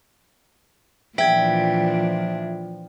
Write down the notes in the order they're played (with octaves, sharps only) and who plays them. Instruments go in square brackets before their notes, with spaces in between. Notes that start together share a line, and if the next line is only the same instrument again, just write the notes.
[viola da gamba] A#2 E3 D4 [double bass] F3 [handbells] E5 G#6 [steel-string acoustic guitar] G5